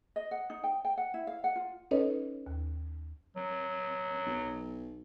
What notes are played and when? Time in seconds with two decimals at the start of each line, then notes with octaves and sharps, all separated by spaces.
0.16 D#5
0.31 F#5
0.50 D#4
0.64 G5
0.85 G5
0.97 F#5
1.14 E4
1.27 F5
1.44 F#5
1.56 F4
1.91 C#4 D#4 A4 B4 C#5 D#5
2.46 D#2
3.36 F#3
4.26 B1